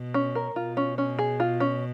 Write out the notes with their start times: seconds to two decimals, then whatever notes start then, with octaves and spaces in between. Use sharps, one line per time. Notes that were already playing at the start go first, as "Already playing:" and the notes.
Already playing: B2
0.14 C#4
0.35 A#4
0.56 B2 F4
0.77 C#4
0.98 C#4
1.19 G#4
1.40 F4
1.60 C#4